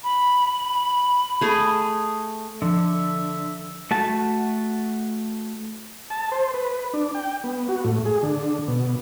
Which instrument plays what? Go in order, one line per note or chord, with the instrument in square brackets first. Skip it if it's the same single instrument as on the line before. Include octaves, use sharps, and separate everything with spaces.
[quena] B5
[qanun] A3 G#4
[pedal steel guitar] D3 [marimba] F3 [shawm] E5
[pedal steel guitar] A3 F#4 A5
[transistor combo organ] A5
C5
B4
D4
G5
B3
F#4
A2
G#4
D3
B2